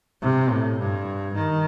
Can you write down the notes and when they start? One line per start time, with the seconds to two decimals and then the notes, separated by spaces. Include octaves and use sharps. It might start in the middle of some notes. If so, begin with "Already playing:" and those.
0.22 C3
0.50 A2
0.79 G2
1.35 D#3